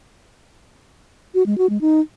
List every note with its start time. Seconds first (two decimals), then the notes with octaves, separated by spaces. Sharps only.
1.34 F#4
1.46 G#3
1.58 F#4
1.70 G#3
1.81 D#4